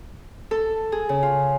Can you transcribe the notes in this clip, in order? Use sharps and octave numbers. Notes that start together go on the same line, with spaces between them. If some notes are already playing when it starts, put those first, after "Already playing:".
A4
G#4
C#3
F4